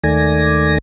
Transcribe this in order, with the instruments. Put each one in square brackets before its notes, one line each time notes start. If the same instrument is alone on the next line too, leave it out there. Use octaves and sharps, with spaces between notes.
[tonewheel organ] D#2 D#3 A3 D5 G#5 A#6